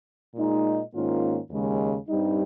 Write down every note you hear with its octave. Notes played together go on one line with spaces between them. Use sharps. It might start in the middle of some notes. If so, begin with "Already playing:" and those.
A#2 G#3 D#4
G#2 D#3 A#3 C#4 F4
D#2 C#3 G#3
G2 G3 C4 D#4